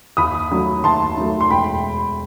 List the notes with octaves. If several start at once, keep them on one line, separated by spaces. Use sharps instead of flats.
D#2 B5 D#6
D#3 F#3 A3
D#2 A5 C6
D#3 F#3 A3
C6
E1 G5 B5